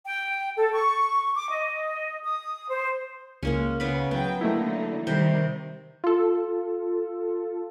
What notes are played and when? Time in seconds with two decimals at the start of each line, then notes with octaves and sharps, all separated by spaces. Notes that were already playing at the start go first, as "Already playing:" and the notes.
0.06 G5
0.56 A4
0.73 C#6
1.35 D6
1.50 D#5
2.23 D#6
2.69 C5
3.43 C#2 G#3 A#3 C#4
3.80 C#3 B3 B5
4.11 F#3 B3 G5
4.41 D3 F#3 A3 A#3 D#4 E4
5.07 C3 D#3 G3 C5
6.04 F4 A4